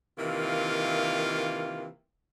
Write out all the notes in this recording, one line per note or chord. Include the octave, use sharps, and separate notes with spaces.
C3 D#3 E3 A#3 F4